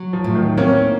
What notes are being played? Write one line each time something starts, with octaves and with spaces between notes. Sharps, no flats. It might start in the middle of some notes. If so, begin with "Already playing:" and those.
Already playing: F#3
F3
A2
D#3
A#3 C4 C#4